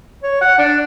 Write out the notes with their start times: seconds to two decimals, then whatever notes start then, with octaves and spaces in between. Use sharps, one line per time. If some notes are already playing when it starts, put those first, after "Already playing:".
0.23 C#5
0.41 F#5
0.59 D4